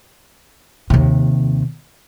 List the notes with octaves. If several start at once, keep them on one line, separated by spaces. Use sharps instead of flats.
D#2 C3